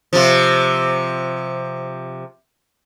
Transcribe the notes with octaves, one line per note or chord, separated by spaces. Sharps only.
C3 F3